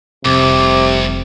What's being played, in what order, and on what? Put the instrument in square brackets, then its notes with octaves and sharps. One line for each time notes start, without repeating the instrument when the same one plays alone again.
[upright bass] F1 [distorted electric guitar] C2 [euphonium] C3 [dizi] D6